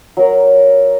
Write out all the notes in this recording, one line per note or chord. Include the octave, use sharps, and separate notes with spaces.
F#3 A#4